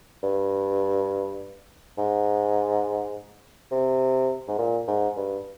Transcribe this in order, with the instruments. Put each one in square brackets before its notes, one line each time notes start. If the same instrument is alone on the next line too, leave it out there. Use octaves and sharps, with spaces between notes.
[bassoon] G2
G#2
C3
G#2
A#2
G#2
G2